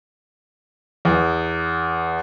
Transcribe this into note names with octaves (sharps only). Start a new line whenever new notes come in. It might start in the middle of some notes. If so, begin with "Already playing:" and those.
E2